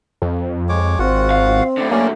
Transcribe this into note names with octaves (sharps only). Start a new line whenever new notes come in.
F2
G#3 C#5 D6
G#1 C4 F4 F#4 F#5
F5
A2 D3 D5
F#3 A#3 C#4 F#4 D5